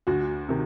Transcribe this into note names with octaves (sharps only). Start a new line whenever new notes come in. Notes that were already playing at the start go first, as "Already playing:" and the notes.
D2 F#4
C3 D#3